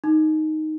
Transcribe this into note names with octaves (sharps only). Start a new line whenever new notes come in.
D#4